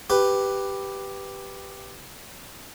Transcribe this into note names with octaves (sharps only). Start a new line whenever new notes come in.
G4 B4